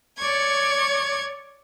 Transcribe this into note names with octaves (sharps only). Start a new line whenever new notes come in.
C#5 D5 C#6 G#6